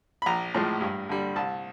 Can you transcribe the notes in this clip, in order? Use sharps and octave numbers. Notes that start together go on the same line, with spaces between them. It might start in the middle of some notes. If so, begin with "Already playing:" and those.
B5
A#1 A#5
A2 F3 G#3
G2
D3 G3
C2 A5